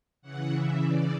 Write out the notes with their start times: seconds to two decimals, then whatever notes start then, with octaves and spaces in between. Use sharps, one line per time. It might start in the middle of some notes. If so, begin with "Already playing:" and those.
0.22 C#3 E3 F#5
0.52 E5
0.82 D5